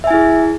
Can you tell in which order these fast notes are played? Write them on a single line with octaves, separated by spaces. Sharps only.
E5 G#5 E4 G#4